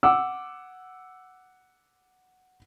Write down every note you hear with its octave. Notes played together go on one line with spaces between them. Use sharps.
F#5 D6 E6